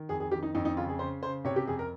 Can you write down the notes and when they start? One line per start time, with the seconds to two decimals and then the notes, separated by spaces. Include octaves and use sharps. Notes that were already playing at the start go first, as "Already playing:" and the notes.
Already playing: D#3
0.09 F2 G#4
0.20 G#4
0.31 D#3 G4
0.43 D#4
0.55 F2 D#4
0.65 D#4
0.77 C#3 F4
0.88 G#4
0.99 C#3 C5
1.23 C#3 C5
1.45 C3 C#5
1.56 G4
1.67 F2 G#4
1.79 A#4